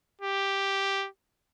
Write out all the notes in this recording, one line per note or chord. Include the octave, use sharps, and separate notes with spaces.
G4